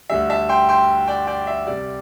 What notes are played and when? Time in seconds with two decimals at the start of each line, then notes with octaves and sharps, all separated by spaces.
0.09 D2 D3 G3 E5
0.30 E5 A5
0.49 G5 C6
0.69 G5 C6
1.07 D5 G5
1.27 D5 G5
1.47 E5
1.67 C2 C3 G3 D5